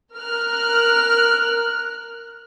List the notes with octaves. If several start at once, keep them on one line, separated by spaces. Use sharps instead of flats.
A#4 F6 F#6